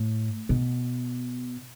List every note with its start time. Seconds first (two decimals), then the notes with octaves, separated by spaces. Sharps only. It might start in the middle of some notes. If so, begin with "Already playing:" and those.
Already playing: A2
0.49 B2